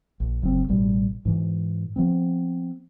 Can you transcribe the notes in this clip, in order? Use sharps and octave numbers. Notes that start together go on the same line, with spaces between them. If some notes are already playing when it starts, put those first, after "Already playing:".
A#1
F#1 C#3 F#3 C4
A1 B2 G3
G#2 E3
F3 B3 C4